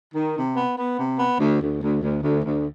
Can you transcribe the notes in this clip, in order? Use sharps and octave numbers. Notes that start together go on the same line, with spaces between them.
D#3
C3
B3
B3
C3
B3
D2
D2
D2
D2
D2
D2